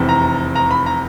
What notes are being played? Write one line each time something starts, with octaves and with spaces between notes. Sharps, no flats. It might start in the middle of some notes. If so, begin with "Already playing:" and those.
Already playing: F1 E2 C3
A#5
A#5
B5
A#5